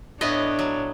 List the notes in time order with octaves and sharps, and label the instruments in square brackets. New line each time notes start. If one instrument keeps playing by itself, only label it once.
[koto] A2 B3 D#5 [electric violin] D4 C#5
[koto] F#3